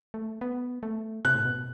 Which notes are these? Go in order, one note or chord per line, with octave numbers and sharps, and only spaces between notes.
A3
B3
A3
C3 F#6
A2
B2